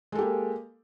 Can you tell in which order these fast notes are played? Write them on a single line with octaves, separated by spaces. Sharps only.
G#3 A4 G4 A#3